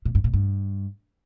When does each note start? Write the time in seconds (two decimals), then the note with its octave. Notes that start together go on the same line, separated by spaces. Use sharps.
0.05 A#2
0.15 G2
0.24 A#2
0.34 G2